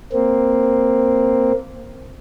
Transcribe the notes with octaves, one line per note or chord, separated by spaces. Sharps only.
A#3 C4